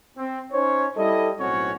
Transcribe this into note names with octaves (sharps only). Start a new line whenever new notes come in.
C4
C#4 D#4 C5 C#5
G3 E4 A4 D#5
B1 A2 C4 C#4 F#4 C#5